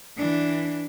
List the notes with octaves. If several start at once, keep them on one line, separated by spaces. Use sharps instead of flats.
E3 D4